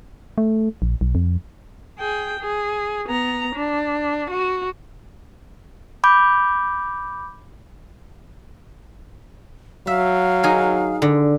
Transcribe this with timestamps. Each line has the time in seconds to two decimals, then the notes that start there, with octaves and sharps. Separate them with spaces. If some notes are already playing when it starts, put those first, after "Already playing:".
0.38 A3
0.82 A#1
1.01 B1
1.15 F2
1.99 G#4 G5
2.40 G#4
3.09 B3 A#5
3.55 D4
4.30 F#4
6.04 B5 D6 G6
9.87 F#3 E5 F5
10.43 D#4 G#4 A#4
11.02 D3